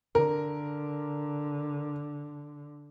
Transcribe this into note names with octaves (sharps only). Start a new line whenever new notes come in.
D3 A#4